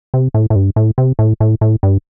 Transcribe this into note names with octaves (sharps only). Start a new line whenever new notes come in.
C3
A2
A2
G2
A2
C3
A2
A2
A2
G2